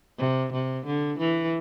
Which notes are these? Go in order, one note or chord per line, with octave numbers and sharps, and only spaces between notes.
C3
C3
D3
E3